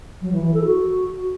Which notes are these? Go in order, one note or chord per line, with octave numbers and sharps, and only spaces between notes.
F#3
E3
E3
A4
F#4